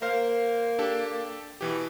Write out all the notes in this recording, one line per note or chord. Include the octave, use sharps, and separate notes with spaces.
A#3 A#4 C5 F5
D4 G4 A4
B2 E3 G4